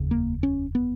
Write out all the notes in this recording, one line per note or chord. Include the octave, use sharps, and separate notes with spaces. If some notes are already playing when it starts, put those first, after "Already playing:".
Already playing: F1 D#2 C#3
A#3
C#4
B3